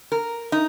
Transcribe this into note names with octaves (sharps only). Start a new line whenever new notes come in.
A#4
D#4